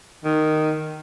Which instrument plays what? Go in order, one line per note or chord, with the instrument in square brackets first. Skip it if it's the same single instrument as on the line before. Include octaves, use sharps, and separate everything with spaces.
[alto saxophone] D#3